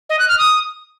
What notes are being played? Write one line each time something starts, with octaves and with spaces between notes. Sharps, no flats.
D#5
F#6
F6
D#6